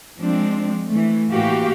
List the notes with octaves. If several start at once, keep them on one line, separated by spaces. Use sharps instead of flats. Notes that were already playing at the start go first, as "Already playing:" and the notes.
F3 G#3 C4 D4
E3 A3
A2 E3 A#3 F#4 G4 F5